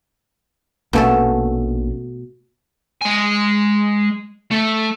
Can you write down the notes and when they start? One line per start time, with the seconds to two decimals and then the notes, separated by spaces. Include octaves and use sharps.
0.93 A#1 B2 A3 A#3 C#4 A4
3.02 G#3 G#5
4.51 A3